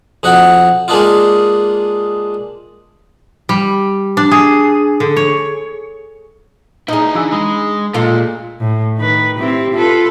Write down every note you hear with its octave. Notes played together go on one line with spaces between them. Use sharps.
F2 D#4 F#4 F#5
G#3 A#3 D4 D#4 F4
G3
D4
G#4
D3
C#5
D#4 E4 G#4 B4 D#5 A#5
E3 D4 F5 E6
G#3 B5
A#2 G#3 F4 A4
A2
D#3 B4
C4 E4 G4
F4 A4 B4